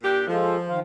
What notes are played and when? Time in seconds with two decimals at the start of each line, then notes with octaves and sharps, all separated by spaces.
0.02 A#2 D4 G4
0.27 F3 G#3 F4 A4
0.68 D#3 C5 F5